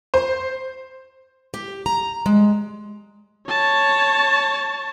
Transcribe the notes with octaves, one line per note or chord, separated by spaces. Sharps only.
C5
G4
A#5
G#3
C#5 A5